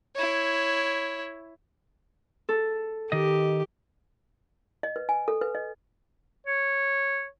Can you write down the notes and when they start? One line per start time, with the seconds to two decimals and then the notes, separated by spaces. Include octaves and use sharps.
0.15 E4 C#5
2.49 A4
3.12 D#3 G4 D#5
4.83 D#5
4.96 B4
5.09 G#5
5.28 A4
5.41 B4
5.55 D#5
6.47 C#5